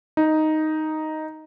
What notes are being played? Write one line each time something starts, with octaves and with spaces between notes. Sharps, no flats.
D#4